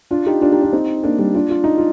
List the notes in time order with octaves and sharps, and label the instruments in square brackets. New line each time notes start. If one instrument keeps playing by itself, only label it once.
[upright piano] D4 F4
D#4 G4
D4 F4
D#4 G4
D4 F4
C4 D#4
A#3 D4
G3 A#3
D4 F4
F4
D#4
F4